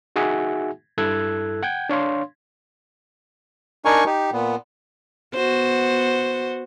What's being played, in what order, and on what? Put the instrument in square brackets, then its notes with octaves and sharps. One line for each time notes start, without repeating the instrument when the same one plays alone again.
[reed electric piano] D#4 F#4 G#4 E5 F#5 G#5
G2 E4 A4 E6 F#6 G#6
F#5 G5 G6 G#6
D4 C#5 F5 C6
[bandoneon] D4 D#4 A#4 G#5 C#6
D#4 G4
A#2 B3
[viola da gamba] B3 F#4 C5